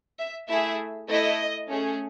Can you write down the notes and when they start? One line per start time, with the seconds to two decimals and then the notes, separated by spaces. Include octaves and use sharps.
0.18 E5
0.49 A3 E4 G#4 E5
1.08 A3 E4 A4 D#5
1.69 A3 C#4 G#4